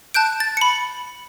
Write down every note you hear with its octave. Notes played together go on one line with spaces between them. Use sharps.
A5 F#6 G6 D7
A6
B5 C#7